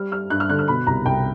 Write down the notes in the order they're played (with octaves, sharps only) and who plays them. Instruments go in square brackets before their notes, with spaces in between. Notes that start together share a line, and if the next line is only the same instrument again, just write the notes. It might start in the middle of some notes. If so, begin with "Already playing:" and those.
Already playing: [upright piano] G3 F6
G3 F6
G2 F#6
F6
D3 F#6
F6
B2 B5
C2 A#5
C2 G5